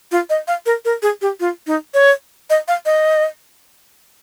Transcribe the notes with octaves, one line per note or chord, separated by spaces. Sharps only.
F4
D#5
F5
A#4
A#4
G#4
G4
F4
D#4
C#5
D#5
F5
D#5